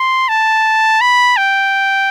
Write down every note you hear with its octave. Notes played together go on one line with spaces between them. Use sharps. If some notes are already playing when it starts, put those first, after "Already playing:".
Already playing: C6
A5
B5
G5